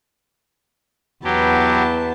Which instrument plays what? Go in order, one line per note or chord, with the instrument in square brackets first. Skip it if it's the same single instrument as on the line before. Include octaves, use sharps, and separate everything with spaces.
[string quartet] E2 B3 A5 [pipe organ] F#3 G4